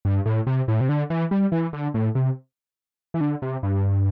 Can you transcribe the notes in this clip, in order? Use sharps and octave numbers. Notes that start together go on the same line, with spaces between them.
G2
A2
C3
A2
C3
D3
E3
G3
E3
D3
A2
C3
E3
D3
C3
G2